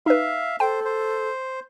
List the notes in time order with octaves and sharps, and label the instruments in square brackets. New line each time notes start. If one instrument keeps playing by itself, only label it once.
[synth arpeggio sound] D#4 B4 [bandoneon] E5 F5
[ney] A4 [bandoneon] C5 [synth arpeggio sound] G5
[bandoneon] C5